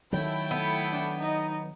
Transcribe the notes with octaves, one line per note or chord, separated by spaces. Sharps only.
D#3 F#3 A3 E4 G5
B3
D4
D#4 D#5